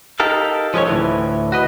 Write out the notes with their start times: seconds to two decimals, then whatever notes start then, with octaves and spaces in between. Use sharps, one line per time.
0.20 D#4 G4 A4 A#4 F5
0.74 F3 G#3 C#4 B4 C#5
0.86 D2 A2 E3
1.52 F#4 B4 D#5